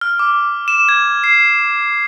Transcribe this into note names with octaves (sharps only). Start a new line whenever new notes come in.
F6
D6
E7
G#6
C7